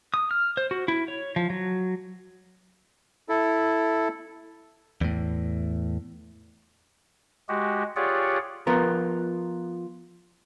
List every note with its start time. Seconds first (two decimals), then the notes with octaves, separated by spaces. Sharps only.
0.14 D#6
0.31 F6
0.57 C5
0.71 F#4
0.88 E4
1.08 C#5
1.36 F3
1.50 F#3
3.29 E4 A4
5.01 E2 A2
7.49 G#3 F#4 G4
7.96 F4 G4 G#4 C#5 D5 F#5
8.67 F3 B3 F4 A#4